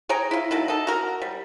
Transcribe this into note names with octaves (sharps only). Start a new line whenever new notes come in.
G#4 C#5 G5 A#5
E4 F4
D#3 F#3 A3
D#4 A4
F#4 A#4
G3